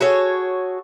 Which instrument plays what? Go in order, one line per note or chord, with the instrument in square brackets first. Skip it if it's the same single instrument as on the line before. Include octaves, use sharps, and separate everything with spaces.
[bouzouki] F#4 G#4 A4 C#5